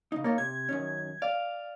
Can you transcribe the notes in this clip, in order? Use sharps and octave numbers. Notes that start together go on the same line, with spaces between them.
C#3 D#4
A#3 D#4 F4 C#5
C3 G#6
F#2 D#3 C#4
D5 F5